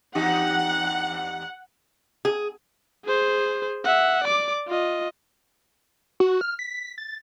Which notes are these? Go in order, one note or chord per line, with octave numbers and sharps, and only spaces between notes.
E2 D#4 G4 F#5
G#4
G#4 C5
E5 F#5
D5 D6
F4 D#5
F#4
F6
B6
A6